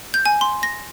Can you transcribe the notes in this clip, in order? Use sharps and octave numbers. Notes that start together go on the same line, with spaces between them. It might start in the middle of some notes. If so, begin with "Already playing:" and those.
G6
G#5
C6
A#6